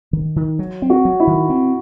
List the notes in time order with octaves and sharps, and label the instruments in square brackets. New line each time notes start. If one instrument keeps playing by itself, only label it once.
[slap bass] D#3
D#3
F#3
C4
[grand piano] F#4
[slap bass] F#3
[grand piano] E4
[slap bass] D#3
C4